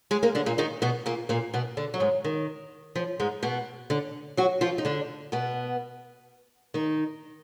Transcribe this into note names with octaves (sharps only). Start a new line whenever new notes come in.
G#3 G#4
A#3 A#4
D3 D4
A#2 A#3
D#3 D#4
B2 B3
A#2 A#3
A#2 A#3
B2 B3
D3 D4
F#3
G#2 G#3
D#3
F3
G#2 G#3
B2 B3
D3 D4
F#3 F#4
F3 F4
D#4
D3 D4
B2 B3
D#3 D#4